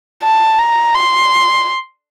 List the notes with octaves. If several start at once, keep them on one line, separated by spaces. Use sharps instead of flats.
A5
A#5
C6